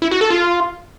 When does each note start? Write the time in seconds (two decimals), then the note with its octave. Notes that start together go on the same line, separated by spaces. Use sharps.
0.02 E4
0.11 F#4
0.21 A4
0.30 F4